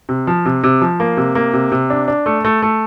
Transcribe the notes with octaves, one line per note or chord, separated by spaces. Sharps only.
C3
F3
C3
C3
F3
A#3
C3
A#3
C3
C3
D4
D4
A3
A3
A3